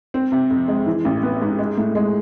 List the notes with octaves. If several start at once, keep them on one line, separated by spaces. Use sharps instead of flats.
C4
C3
F2
G#3
E3
A1
B3
G#2
G#3
A2
G#3